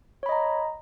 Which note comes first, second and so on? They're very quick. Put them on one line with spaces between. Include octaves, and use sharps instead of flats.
C#5 B5 D#5 A#5